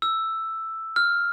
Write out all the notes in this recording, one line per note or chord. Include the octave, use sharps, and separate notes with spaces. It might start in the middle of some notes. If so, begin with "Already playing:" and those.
E6
F6